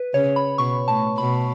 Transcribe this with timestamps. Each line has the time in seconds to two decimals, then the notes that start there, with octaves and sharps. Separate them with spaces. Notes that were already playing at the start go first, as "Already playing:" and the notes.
Already playing: B4
0.14 C#3 C#5
0.36 B5
0.58 B2 C#6
0.88 A2 A5
1.18 B2 B5